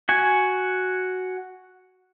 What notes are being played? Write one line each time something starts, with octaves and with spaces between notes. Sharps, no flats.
F#4 G#5